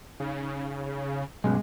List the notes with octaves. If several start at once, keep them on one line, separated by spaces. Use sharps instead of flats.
C#3 D#4
B1 G2 G3 G#3 C#4